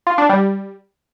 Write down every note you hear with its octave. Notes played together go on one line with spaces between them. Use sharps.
F4
D4
G3